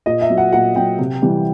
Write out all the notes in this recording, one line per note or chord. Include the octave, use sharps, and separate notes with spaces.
A#2 D#5
E5
F#3
F#5
A#2 F#5
F#3 G5
C3
E3 G3